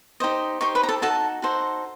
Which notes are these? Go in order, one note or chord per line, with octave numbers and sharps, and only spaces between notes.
D#4 G4 C5 D#5
D#4 G4 C5 C#6
B4 B5
A#5
A4 A5
D#4 F#4 A4 A5
D#4 F#4 A4 C5